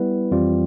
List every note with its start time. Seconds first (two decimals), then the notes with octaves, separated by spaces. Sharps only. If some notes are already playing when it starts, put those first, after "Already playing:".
Already playing: G3 B3 E4 B4
0.31 F2 E3 G3 C4 F4